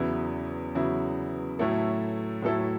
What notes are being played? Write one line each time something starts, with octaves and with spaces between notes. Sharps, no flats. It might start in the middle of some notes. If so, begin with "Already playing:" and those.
Already playing: E2 C#3 F#3 B3 E4
E2 C#3 F#3 B3 E4
A2 F#3 A3 E4 A4
A2 F#3 A3 E4 A4